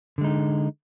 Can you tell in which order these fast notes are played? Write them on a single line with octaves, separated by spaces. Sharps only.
D3 G#3 D#4